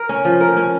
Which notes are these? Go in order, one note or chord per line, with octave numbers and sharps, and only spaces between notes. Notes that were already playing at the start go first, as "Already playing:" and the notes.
Already playing: A#4
C#4
F3
A#4
C#4